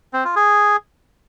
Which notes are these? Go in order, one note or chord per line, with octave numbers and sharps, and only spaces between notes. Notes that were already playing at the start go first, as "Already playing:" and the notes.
C4
F4
G#4